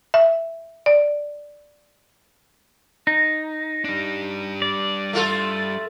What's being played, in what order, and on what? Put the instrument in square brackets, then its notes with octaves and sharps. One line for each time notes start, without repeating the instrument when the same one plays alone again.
[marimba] E5
D5
[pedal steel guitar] D#4
[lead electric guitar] G3 D4
[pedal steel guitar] D5
[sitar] A3 F4 A4